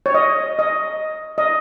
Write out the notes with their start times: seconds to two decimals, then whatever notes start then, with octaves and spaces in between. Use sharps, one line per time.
0.06 C#5
0.14 D#5
0.59 D#5
1.38 D#5